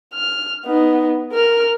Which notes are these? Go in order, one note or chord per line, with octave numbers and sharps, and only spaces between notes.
F6
B3 D#4
A#4 F6